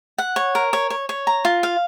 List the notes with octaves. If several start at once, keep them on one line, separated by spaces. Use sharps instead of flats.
F#5
C#5
A#4
C#5
C#5
C#5
A#5
F4
F5